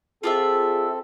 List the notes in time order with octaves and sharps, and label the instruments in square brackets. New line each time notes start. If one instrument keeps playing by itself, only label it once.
[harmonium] C4 A4 [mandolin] F4 D5 E5 [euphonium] G#4